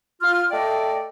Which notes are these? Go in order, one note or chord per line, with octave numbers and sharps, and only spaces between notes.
F4 F6
A3 D5 D#5 G5